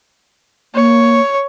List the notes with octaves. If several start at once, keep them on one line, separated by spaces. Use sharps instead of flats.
A#3 C#5